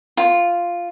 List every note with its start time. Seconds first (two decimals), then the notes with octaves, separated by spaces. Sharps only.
0.17 F4